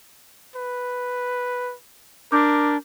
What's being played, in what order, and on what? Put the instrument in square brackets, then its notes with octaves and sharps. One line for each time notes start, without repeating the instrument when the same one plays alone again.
[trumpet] B4
[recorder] D4 [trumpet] A#4 [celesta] D6 G6